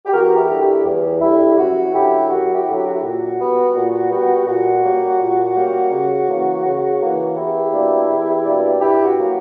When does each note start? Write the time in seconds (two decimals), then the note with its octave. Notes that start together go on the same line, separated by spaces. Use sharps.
0.06 G4
0.13 E2 F#4 A#4
0.37 E4 G4
0.50 D3 G3
0.61 E4 G4
0.85 E2
1.21 D3 G3 E4
1.48 G4
1.58 F#2 F#4
1.94 D3 F#3 E4 G4
2.30 F#2 F#4
2.54 E4 G4
2.67 D3 F#3
2.78 G4
2.86 F#4
2.93 E4 G4
3.02 A#2 F#4
3.39 G3 B3
3.75 A#2
4.11 G3 B3
4.47 A#2 F#4
4.84 G3 A#3 C#4
5.20 A#2
5.55 G3 A#3 C#4
5.91 C#3
6.28 E3 A#3 C#4
6.65 C#3
7.00 E3 A#3 C#4
7.36 E2 E4 G4
7.73 B2 A#3 D4
8.09 E2
8.45 B2 A#3 D4
8.81 G2 E4 G4
9.05 F#4
9.17 F#3 A#3